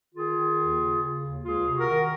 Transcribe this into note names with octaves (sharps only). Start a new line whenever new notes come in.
D#3 F4 G#4
D#3
D#2
C#3
C#3
D#2
C#2 F4 G#4
C3
F#4 A#4
D#3